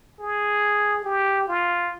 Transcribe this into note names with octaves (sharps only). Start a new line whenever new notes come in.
G#4
G4
F4